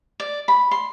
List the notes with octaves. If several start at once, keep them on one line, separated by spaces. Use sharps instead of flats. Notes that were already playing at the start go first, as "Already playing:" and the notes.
D5
B5
C6